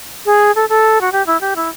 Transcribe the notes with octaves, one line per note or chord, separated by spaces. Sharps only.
G#4
A4
A4
F#4
G4
E4
G4
E4